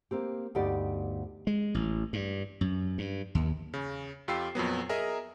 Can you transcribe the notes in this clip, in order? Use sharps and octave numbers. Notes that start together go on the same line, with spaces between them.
A#3 C4 G4
D2 G2 B3 D#4 G4 D5
G#3
A1
G2
F#2
G2
D#2
C#3
F2 F4 G4 G5 E6 C7
F2 A#2 F#3 B3
G#4 A#4 D#5 E5 A#5